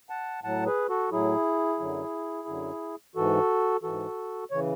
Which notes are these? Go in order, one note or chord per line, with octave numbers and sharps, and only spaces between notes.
F#5 A5
A2 F#3 F#5 A5
G#4 B4
F#4 A4
A2 F#3 E4 G#4
F#2 D3 F#3
F#2 D3 F#3
G#2 E3 F#4 A4
G#2 E3 F#4 A4
C#3 E3 C#5